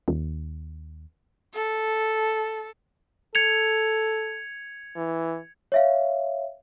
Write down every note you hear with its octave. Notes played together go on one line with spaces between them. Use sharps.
D#2
A4
A4 G#6 C#7 F7
E3
C#5 E5 F5